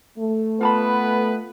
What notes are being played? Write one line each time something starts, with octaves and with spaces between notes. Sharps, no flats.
A3
B3 F4 B4 A5 B5